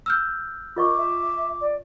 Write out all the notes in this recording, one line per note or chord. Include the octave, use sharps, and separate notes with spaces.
E6 F6 G6
F4 A#4 D#5 C#6 D6
E5
D5